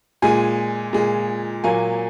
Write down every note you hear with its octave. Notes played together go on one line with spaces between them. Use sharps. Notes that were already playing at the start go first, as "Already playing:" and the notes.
A#2 G#3 G#5
A#2 G#3
A#2 F#3 A#3 G#5